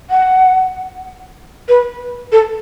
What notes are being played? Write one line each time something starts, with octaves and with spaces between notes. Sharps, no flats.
F#5
B4
A4